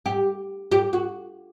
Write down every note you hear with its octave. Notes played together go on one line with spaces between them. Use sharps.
G4
G4
F#4